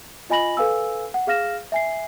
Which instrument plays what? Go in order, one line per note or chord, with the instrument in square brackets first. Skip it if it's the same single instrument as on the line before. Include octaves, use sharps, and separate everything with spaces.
[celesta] F4 D#5 G#5 B5 A#6 F#7
A4 B4 F5 G#5 E6
F#5
G#4 F5 F6 A#6 E7
E5 G#5 C7